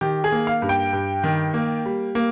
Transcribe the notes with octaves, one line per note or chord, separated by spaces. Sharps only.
D#3 G4
G#4
A#3
F5
G2
G5
G2
D#3
A#3
G3
A#3